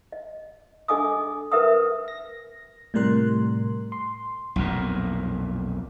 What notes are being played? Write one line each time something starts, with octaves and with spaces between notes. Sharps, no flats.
D#5
D4 A4 D#5 G#5 D6 D#6
A#4 B4 E5 G5 D#6
A#6
A2 C3 G3 A#4 C6 F#6
C6
B1 F2 A#2